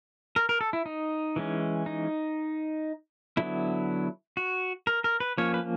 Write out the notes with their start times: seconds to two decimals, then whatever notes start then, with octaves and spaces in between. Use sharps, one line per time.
0.36 A#4
0.49 A#4
0.61 A4
0.73 E4
0.86 D#4
1.36 E3 G#3 C#4
1.86 D#4
3.37 D3 F#3 B3 E4
4.37 F#4
4.87 A#4
5.04 A#4
5.20 B4
5.38 F3 A#3 C#4 C#5
5.54 B4